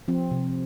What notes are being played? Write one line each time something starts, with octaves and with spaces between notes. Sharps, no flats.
F3 C4
C3